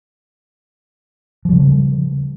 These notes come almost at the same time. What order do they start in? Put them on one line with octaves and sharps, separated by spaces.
F3 G3 C#3